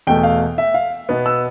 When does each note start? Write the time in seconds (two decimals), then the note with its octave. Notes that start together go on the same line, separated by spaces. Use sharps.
0.07 E2 B2 A3 G5
0.23 F5
0.58 E5
0.74 F5
1.09 B2 B3
1.26 E6